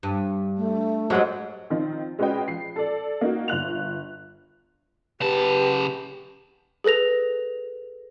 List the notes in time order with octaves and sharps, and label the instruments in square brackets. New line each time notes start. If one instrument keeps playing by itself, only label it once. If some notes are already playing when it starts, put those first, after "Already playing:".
[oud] G2
[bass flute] A3
[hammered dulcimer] G#2 [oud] F#3 G3
[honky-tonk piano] D#3 F3 C4 D#4
G#3 C#4 F#4 B4 D#5 G5
F3 C7
A4 D5
A#3 D#4 F#4
G1 F4 F#6 F7
[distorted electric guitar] C#3 A5 [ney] G4 [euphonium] B4
[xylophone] G#4 A4 B4 A#6 F7